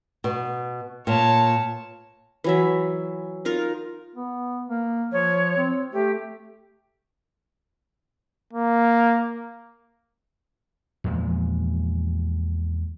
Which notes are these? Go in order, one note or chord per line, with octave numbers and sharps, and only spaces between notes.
B2
A#2 C#5 A5
E3 F#3 E5
D#4 F4 A#4
B3
A#3
F3 C#5
C4
A3 G4
A#3
E2 A#2 F3 G#3